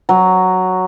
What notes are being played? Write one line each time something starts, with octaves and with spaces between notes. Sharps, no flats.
F#3